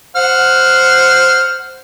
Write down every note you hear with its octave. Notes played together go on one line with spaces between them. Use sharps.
C5 F#5 F6